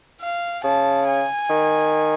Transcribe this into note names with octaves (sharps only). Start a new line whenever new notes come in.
F5
C#3 A5
G#5
D#3